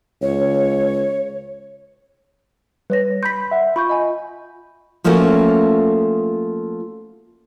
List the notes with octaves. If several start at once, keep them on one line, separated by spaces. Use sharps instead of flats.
C#2 C#5
G3 B4 C#5 A#6
B5 C6 G6 B6
E5 F#5
F4 B5 C#6 G6
D#5 G#5
F3 A3 A#3 C#4 F#4